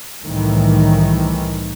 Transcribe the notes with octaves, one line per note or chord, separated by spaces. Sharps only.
C2 A2 D#3 E3